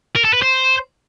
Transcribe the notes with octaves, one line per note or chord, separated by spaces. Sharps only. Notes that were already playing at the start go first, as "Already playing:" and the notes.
A#4
A4
B4
C5